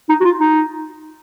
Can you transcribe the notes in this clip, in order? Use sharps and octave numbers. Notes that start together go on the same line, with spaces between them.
D#4
F#4
F4
D#4